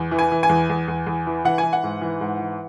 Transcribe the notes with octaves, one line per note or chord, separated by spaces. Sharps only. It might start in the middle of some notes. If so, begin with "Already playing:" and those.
Already playing: E2
E3
G#5
E3
G#5
E2
E2
E2
E2
E3
E3 F#5
G#5
E3
F#5
G#2
E3
G#2
E3